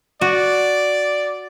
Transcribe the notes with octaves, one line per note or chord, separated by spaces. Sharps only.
F#4 D5